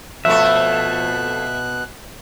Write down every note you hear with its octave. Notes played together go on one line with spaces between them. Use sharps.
F2 B2 A3 E5 F#6